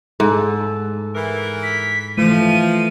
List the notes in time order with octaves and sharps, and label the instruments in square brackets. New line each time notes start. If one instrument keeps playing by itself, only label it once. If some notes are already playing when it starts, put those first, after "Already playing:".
[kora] G#2 [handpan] A4
[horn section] E3 A#4
[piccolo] B6
[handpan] E3 A3 [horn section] F3 [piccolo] D#7